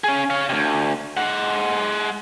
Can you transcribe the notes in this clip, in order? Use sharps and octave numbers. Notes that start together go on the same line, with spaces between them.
C#4 G#4
C#5 F5
D2 C3
G#3 F#5